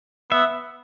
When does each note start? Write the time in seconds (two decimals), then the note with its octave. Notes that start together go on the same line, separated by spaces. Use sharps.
0.31 B3 E5